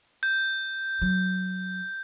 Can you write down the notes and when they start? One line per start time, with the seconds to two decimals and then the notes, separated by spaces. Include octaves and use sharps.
0.23 G6
1.02 F#3